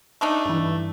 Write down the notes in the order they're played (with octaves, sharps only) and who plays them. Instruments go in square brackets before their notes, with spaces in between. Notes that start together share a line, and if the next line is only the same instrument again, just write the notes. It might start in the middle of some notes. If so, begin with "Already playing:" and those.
[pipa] A3 D4 D#4
[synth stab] G2 E3